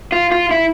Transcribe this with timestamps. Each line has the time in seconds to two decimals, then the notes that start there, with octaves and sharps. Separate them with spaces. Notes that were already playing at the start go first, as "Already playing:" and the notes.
0.12 F4
0.31 F4
0.51 E4